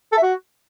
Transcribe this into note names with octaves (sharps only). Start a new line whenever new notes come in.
A4
E5
F#4